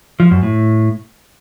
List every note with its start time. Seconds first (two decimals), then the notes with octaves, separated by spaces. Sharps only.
0.20 F3
0.31 F#2
0.43 A2